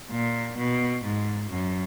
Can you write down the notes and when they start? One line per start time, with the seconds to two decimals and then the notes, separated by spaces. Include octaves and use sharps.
0.11 A#2
0.58 B2
1.05 G#2
1.51 F#2